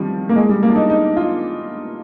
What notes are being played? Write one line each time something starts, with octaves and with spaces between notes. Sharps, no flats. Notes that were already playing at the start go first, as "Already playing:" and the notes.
Already playing: D#3 F3 G3 C4
A#3
G#3
G3
A#3
D4
D#4
D#4
F4